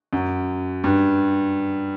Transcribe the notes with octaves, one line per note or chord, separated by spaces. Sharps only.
F#2
G2